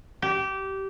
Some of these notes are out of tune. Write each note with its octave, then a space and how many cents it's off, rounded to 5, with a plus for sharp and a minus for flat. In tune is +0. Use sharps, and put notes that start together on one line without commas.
G4 -20